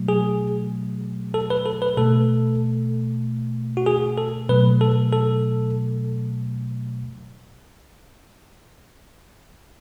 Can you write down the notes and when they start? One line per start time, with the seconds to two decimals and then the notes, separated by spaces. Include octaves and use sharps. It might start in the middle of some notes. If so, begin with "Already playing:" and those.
Already playing: B2 F#3 A3
0.08 G#4
1.34 A4
1.50 B4
1.66 A4
1.82 B4
1.97 B2 A3 A4
3.77 F#4
3.86 G#4
4.18 A4
4.49 B2 F#3 A3 B4
4.81 A4
5.13 A4